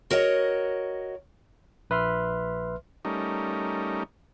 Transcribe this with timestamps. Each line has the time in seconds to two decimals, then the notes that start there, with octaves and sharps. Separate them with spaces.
0.11 F#4 A#4 C#5 D#5
1.90 A#1 B4 E5 C6 F6
3.05 G3 A3 C#4 D#4 A#4